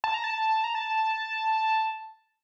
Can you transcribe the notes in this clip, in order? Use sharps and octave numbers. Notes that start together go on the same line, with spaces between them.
A5
A#5
A5
A#5
A5